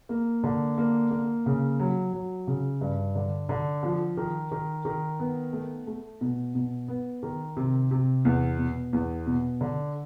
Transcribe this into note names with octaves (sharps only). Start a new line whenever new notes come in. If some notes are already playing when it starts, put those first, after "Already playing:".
A#3
D3
A#3
A#3
C#3
F#3
F#3
C#3
G2
D3
D3
F3
D#3
D#3
D#3
B3
A3
A3
B2
B2
B3
D#3
C3
C3
E2
B2
E2
B2
D3